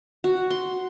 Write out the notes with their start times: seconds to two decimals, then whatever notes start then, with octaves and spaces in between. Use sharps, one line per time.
0.24 F#4
0.50 C6